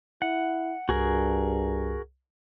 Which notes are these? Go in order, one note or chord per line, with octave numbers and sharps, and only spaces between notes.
E4 F#5
C2 G2 F#4 G#4 A#4